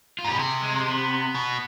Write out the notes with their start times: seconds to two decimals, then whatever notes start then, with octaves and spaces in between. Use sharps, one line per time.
0.19 F4
0.24 G#2
0.29 B2 G4
0.39 C3 G#4
0.63 G#3
0.76 G#3
0.87 B3
1.35 B2